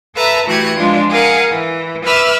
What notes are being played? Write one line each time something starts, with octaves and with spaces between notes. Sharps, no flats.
A4 B4 E5 A5 A#5
E3 A3 F#4 G4 F#6 G#6
F3 G#3 D4 F4
G#4 A#4 F5 F#5 G#5
E3
B4 E5 B5 D6 E6 F6